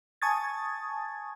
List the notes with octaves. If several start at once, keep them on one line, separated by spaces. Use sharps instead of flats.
G#5 A5 C#6 D#6 G#6 A6